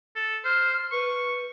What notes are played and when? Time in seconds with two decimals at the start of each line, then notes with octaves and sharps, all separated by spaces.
0.15 A4
0.44 C5 F6
0.92 B4 C#6